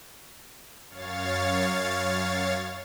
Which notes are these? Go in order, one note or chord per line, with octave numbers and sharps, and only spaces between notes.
F#2 C#5 F5 A6